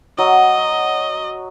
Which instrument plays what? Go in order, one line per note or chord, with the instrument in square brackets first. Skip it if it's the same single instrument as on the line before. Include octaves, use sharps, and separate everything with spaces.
[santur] F#3 [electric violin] D#5